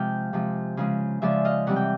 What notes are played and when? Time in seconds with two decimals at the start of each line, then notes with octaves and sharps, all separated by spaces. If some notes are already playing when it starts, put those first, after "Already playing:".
Already playing: C3 F3 G#3 F5 G5
0.33 C3 F3 G#3
0.77 C#3 F3 G#3
1.22 C#3 F3 G#3 D5 E5
1.45 D#5 F5
1.67 C3 E3 G3 C4 F#5
1.76 G5